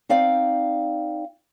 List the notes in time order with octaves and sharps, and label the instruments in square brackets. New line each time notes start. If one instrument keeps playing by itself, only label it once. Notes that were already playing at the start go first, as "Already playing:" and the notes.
[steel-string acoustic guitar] C4 D#4 D5 F5 G5